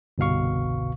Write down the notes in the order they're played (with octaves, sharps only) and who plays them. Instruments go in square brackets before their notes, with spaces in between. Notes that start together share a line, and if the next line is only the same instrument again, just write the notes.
[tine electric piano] G1 C2 B2 F5 C#6